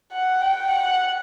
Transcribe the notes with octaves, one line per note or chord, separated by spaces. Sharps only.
F#5
G5
F#5